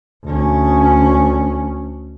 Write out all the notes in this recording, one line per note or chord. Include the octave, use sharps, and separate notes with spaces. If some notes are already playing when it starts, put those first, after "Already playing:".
D2 C#4